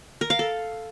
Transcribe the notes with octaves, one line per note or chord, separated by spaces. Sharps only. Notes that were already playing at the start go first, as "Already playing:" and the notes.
A#4
F5
A4